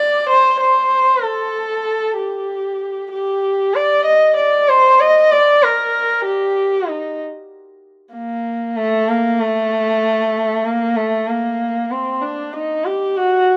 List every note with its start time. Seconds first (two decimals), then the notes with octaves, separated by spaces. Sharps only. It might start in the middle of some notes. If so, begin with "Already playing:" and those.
Already playing: D5
0.29 C5
0.61 C5
1.24 A4
2.17 G4
3.12 G4
3.75 D5
4.05 D#5
4.37 D5
4.69 C5
5.00 D#5
5.32 D5
5.63 A#4
6.25 G4
6.88 D#4
8.15 A#3
8.77 A3
9.09 A#3
9.40 A3
10.65 A#3
10.96 A3
11.28 A#3
11.91 C4
12.22 D4
12.53 D#4
12.85 G4
13.17 F#4